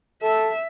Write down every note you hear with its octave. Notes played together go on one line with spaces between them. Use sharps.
A4 E5